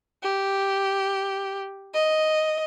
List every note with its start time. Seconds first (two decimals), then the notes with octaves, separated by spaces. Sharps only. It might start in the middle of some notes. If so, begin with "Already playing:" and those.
0.23 G4
1.94 D#5